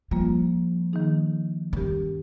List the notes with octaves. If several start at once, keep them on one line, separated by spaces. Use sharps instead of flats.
F3 G3 A#3 F4
D#3 A#3 D#4 G#4
G2 D#3 G3 C#4 G4